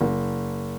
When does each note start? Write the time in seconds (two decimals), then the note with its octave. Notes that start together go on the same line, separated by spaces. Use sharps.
0.01 F#1